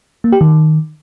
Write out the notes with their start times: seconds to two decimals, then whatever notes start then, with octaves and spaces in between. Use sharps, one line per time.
0.24 A#3
0.32 G4
0.41 D#3